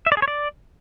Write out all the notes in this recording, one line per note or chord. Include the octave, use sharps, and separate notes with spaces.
E5
D5
G#4
C#5
D5